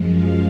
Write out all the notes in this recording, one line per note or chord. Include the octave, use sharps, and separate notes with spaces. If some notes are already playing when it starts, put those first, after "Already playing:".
Already playing: F#2 F3 G#3
F5